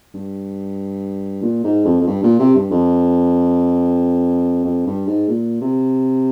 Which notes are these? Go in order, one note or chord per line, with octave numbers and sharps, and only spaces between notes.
G2
A#2
G#2
F2
F2
G2
A#2
C3
G2
F2
F2
G2
G#2
A#2
C3